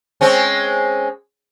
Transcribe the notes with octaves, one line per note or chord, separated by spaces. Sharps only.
G#3 C4 C#4